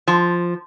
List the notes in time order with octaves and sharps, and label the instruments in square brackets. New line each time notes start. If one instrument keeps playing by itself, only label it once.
[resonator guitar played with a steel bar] F3